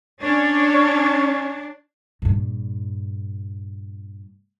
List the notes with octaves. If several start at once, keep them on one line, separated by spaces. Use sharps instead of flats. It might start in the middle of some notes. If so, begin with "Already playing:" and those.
C#4 D4 C#5
G2 A#2